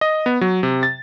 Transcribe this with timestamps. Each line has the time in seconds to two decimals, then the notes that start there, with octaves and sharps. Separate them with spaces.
0.01 D#5
0.26 B3
0.41 F#3
0.63 C3
0.83 A6